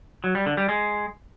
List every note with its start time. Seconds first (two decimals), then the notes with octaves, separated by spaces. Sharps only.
0.24 F#3
0.35 G3
0.46 D3
0.57 G3
0.69 G#3